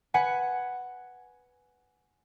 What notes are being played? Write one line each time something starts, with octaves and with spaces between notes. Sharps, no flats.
B4 F#5 G#5